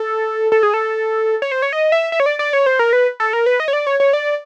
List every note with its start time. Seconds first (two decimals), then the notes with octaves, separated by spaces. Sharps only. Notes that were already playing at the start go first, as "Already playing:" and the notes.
Already playing: A4
0.52 A4
0.63 G#4
0.74 A4
1.42 C#5
1.52 C5
1.62 C#5
1.73 D#5
1.92 E5
2.12 E5
2.20 C#5
2.26 D5
2.39 D5
2.53 C#5
2.66 C5
2.79 A#4
2.93 B4
3.20 A4
3.33 A#4
3.46 B4
3.60 D#5
3.68 C#5
3.73 D5
3.87 C#5
4.00 C#5
4.13 D5